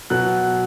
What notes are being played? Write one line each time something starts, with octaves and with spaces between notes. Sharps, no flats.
B2 F#3 B3 F#6